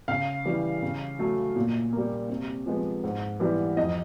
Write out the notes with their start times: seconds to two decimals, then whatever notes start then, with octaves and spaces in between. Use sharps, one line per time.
0.08 C#3 F5
0.45 E3 G3
0.82 C#3
1.19 F#3 A3
1.56 A#2
1.93 G3 A#3
2.30 C3
2.66 F3 G#3 B3
3.04 G#2
3.40 E3 G3 B3
3.77 F2 D#5